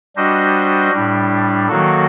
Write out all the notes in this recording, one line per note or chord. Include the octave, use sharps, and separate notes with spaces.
G3 D4 F#4 C5 D#5
A2 G3 D4
D#3 F#3 A#3 F#4 A4